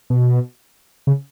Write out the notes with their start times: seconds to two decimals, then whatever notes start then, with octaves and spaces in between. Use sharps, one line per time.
0.10 B2
1.07 C#3